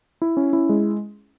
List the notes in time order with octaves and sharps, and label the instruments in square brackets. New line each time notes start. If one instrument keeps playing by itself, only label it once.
[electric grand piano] E4
C#4
E4
G#3